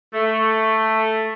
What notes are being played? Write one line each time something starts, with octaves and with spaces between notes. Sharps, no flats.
A3